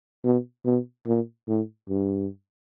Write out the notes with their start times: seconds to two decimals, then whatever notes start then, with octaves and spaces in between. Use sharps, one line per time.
0.25 B2
0.66 B2
1.07 A#2
1.48 A2
1.89 G2